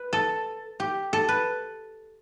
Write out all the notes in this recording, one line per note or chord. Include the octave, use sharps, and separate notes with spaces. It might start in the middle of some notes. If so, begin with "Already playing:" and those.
Already playing: B4
A4
G4
A4
B4